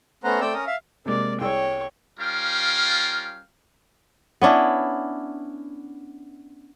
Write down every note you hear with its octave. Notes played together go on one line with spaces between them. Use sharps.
A3 B3 C#4 C5 F#5 A#5
A3 C4 D5 G5 E6
C#4 A#4 D#6
E5 F5
C3 G#3 A#3 D5
C2 G#4 C#5 G5 E6
G3 C#4 F4 A#4 F5 G5
B3 C#4 D4 E4